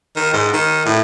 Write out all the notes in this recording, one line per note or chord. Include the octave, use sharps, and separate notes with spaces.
D#3
G#2
D#3
A2